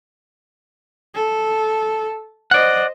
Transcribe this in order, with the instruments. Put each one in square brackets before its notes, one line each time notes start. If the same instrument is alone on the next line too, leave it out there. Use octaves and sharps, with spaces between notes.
[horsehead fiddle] A4
[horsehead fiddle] C5 D#5 [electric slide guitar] D5 F#5